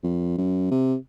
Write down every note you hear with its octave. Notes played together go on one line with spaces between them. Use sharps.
F2
F#2
C3